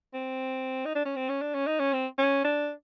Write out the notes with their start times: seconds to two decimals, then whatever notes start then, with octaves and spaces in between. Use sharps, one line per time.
0.14 C4
0.85 D#4
0.96 D4
1.05 C#4
1.16 C4
1.29 C#4
1.42 D4
1.55 C#4
1.67 D#4
1.80 C#4
1.93 C4
2.18 C#4
2.44 D4